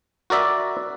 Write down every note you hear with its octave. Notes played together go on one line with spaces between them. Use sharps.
F#4 A#4 D5 E5